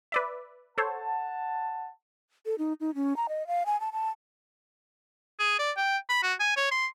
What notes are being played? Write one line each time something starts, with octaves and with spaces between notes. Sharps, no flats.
B4 D5 E5
A4 C5 C#5 F#5 A5
A4
D#4
D#4
C#4
A#5
D#5
F5
G#5
A5
A5
G#4
D5
G5
B5
F#4
G#5
C#5
C6